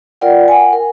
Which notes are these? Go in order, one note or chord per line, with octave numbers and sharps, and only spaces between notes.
F4 A#4 D5 F#5 G5
F#5 G#5
A#4